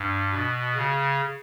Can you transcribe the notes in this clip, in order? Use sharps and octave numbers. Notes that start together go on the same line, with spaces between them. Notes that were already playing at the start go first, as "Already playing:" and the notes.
Already playing: G2
B2
C#3